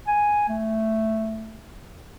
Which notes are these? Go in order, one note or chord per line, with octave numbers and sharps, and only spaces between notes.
G#5
A3